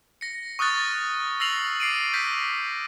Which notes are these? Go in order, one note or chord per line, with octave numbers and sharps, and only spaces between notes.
A#6 C#7
C#6 D#6 F6 F#6 A6
E6 F6 A#6 C7 F7 F#7
D6 C7 D7 D#7
F6 G6 A#6 B6